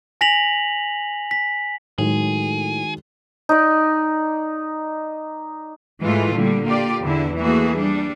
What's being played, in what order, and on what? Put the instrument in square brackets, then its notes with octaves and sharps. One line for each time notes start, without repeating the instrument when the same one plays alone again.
[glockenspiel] G#5 A#6 B6 F7 F#7
B6
[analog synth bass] A2 [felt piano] D#3 F#3 G#3 [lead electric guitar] G#4
[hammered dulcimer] D#4 D5
[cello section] G#2 E3 G#3 A3 E4 F4
A#2 D3 G3
A#3 F4 G4 D5
E2 D3 E4
E3 A3 A#3 F#4 G#4
G3 D4